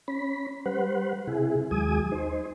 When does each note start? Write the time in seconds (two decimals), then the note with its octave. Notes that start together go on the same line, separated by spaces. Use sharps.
0.08 C#4 B5
0.66 G3 B4 C5 F#5
1.27 C3 E4 G#4
1.71 D#2 F#3 G#3 G#5 D#6
2.12 D#4 C5